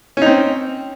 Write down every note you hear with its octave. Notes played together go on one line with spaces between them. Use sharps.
C4 C#4 D#4